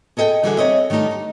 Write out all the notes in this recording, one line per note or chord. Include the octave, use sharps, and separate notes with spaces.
G#4 A4 D#5 E5 G5
D3 E3 G3 F#4 G#4
C4 A#4 C#5 D#5 E5
D#3 G3 A3 D#4 G4
D#4